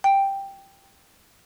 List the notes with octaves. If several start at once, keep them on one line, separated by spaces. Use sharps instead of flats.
G5